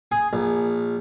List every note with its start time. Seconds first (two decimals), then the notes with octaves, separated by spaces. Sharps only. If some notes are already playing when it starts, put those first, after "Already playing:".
0.12 G#4
0.33 A#1